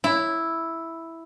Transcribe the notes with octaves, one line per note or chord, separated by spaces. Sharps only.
E4